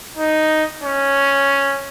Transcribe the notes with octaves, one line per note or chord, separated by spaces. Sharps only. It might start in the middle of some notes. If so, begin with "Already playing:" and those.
D#4
C#4